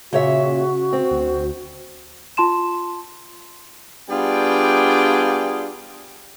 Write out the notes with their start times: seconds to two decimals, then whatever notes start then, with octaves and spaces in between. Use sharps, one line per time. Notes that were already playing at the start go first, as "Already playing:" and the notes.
0.13 A#2 C#3 F#4 C#5 E5
0.93 C4
1.11 D2
2.37 F4 A5 C6 E7
4.10 G3 B3 D4 F4 G#4 G5